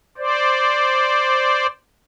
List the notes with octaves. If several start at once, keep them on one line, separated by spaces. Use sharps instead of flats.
C5 D5